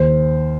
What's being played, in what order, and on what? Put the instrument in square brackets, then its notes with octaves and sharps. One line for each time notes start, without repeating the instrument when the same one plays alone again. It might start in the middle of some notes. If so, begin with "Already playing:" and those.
Already playing: [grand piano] D#2 C5